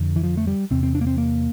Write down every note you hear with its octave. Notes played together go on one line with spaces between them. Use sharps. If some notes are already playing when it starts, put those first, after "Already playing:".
Already playing: F2 D3
E3
F3
A3
G3
E2 C3 C4
C4
D4
A#3
C4
A#3